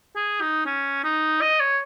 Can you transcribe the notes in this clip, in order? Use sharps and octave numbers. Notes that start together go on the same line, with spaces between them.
G#4
D#4
C#4
D#4
D#5
C#5